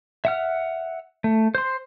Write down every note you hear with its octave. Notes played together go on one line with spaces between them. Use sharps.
E5 F#5 F6
A3
C5 C6